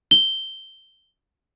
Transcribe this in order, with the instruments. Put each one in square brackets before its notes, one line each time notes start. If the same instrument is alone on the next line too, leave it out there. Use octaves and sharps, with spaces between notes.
[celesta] G7